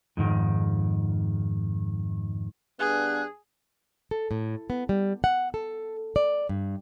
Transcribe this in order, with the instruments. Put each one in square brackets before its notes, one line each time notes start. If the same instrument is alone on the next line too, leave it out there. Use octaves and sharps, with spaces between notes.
[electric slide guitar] F2 G#2 D#3
[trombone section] G2 B3 D4 [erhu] G#4 [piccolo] F#6
[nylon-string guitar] A4
A2
B3
G3
F#5
A4
D5
G2